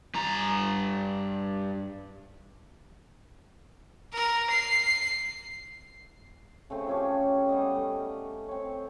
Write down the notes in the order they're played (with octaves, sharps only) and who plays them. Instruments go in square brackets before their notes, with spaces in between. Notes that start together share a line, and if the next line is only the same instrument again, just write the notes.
[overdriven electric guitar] G2 A#5
[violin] A#4
C7
[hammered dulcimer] C#3 A3 C4
F3 C#4 G4
G3 B3 D#5
A3
C4 C#5